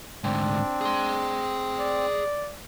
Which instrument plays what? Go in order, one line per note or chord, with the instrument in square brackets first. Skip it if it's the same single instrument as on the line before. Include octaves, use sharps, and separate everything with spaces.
[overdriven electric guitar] D2 G#2 [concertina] C4 [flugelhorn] D4
[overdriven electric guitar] G#4 C6
[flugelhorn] D5